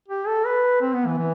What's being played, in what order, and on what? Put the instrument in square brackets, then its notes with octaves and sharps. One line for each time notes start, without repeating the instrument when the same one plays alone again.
[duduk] G4
A4
B4
C4
B3
E3
E3